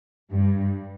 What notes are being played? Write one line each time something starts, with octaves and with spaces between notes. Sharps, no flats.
G2